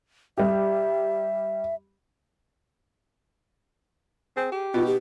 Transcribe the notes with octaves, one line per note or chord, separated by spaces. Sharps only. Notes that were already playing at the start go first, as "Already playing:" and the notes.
G3 G4 E5
C4 G#4
G4
B2 B3 D#4 F4
G4